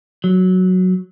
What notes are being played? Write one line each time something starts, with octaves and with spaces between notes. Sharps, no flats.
F#3